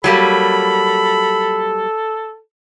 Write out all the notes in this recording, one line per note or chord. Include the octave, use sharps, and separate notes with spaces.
F#3 G3 A#3 A4 B5